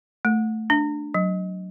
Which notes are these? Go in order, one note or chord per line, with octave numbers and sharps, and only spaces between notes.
A3
D4
F#3